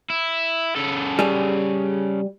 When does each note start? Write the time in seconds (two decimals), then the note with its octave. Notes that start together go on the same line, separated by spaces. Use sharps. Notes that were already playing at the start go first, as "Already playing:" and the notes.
0.10 E4
0.76 C#3 A4
1.19 G3 G#4